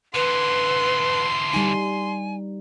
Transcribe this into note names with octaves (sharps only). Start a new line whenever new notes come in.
D3 E3 B4 C6
G3 D#4 G#5